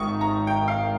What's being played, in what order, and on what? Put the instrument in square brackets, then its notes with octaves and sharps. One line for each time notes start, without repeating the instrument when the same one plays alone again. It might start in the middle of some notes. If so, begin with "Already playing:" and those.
Already playing: [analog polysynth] G#1 G#2 D#3 [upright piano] C#6 D#6
[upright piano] A#5
G5
F5